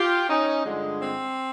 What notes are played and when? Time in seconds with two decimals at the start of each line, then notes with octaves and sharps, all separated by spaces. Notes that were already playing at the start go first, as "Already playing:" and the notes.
Already playing: F4 G4
0.29 C#4 D#4
0.64 G2 D3 F3 G#3
1.00 C4